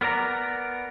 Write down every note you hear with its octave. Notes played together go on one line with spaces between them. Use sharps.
B3 A#4 D5 A#5